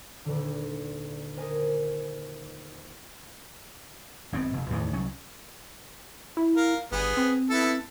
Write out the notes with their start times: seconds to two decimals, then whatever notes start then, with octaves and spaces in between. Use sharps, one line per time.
0.25 D#1 D3
1.37 A#4 C5 D#5 G#5
4.32 G#1 F#2 B3 C4
4.53 F1
4.70 E2 A2 D#3 E3
4.93 C2 F#3 C#4
6.37 E4
6.56 A#4 F5
6.92 G1 B3 G#4
7.17 C4
7.50 B3 E4 A4